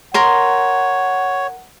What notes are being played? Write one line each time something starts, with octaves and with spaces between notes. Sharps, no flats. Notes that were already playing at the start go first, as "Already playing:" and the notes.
A#4 C#5 F#5 C6